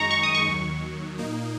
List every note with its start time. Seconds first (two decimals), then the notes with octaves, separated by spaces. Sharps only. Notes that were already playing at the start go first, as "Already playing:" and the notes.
Already playing: F#2 D#3 G#3 D#4 A#5 C#6
0.11 C#6
0.23 D#6
0.35 C#6
0.47 D#2 D#3 F#3
1.18 A#2 A#3 D#4